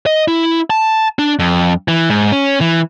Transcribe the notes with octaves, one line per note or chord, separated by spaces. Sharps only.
D#5
E4
A5
D4
F2
E3
G#2
C#4
E3